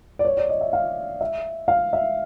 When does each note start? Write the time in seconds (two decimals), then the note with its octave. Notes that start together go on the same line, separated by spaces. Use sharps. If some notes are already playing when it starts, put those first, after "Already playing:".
0.19 D5
0.25 C#5
0.37 D5
0.49 D#5
0.61 E5
0.73 F5
1.21 E5
1.68 F5
1.93 E5